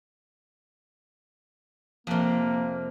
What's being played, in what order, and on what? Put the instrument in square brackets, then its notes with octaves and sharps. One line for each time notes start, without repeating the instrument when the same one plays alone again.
[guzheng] F2 C3 [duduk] A#3